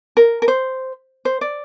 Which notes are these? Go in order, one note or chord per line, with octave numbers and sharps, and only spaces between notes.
A#4
A#4
C5
C5
D5